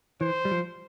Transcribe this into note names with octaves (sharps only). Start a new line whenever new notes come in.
E3 C5
G3
F3